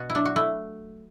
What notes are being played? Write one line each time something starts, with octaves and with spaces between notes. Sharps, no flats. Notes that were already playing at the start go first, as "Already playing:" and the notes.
Already playing: B2 F#4
E4
F#3 D4
F#4
A3 E4